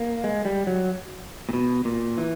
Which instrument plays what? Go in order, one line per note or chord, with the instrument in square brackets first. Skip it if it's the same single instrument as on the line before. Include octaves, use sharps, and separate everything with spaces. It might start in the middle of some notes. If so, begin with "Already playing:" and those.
Already playing: [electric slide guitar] A#3
G#3
G3
F#3
A#2
B2
A#2
E3